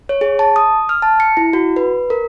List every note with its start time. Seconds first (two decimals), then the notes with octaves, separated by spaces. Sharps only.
0.09 C#5
0.21 G#4
0.39 A5
0.56 D#6
0.89 F6
1.02 A5
1.20 C#7
1.37 E4
1.53 F#4
1.76 B4
2.10 A#4